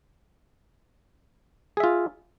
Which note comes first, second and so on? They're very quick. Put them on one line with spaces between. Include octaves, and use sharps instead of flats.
G#4 E5 F4